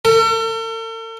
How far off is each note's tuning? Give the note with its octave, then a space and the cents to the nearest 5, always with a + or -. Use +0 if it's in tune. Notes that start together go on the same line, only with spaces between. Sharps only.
A4 +45